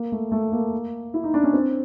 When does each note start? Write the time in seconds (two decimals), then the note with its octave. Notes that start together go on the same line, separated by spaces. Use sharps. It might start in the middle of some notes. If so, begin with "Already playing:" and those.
Already playing: A#3
0.12 A3
0.32 A3
0.52 A#3
1.14 E4
1.24 D#4
1.34 D4
1.43 C#4
1.53 C4